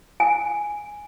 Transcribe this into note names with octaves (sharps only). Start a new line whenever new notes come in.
G#5